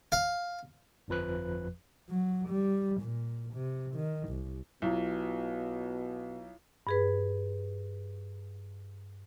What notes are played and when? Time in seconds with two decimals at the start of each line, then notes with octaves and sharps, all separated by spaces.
0.12 F5
1.08 G1 F2 F3 B4 F#6
2.10 F#3
2.49 G3
3.02 A#2
3.54 C3
3.95 D#3
4.29 C2
4.82 B1 B2 E4 F4
6.87 G2 G#4 B4